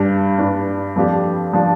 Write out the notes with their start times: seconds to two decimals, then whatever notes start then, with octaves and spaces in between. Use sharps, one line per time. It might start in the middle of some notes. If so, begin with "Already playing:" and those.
Already playing: G2 G3 D4
0.38 G2 G3 D4
0.96 F2 F3 D4 G4
1.53 F3 D4 G4